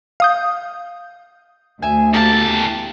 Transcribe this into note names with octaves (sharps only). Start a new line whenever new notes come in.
F5 D#6 G6
D2 E5 G#5
E2 A#3 G4 A4 A5